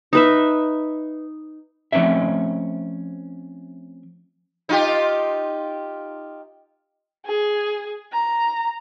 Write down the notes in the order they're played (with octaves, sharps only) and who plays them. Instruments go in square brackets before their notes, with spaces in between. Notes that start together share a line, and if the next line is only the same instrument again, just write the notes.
[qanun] D#4 B4 E5
[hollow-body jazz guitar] F3 A3 C4 C#4 E5
[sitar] D#4 F4 G4
[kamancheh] G#4
A#5